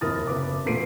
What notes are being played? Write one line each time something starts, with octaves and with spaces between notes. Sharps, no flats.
F1 D#2 E4 A#4 D#6 A6
F#1 B4 D6
E1 A#2 A3 C7 D7 D#7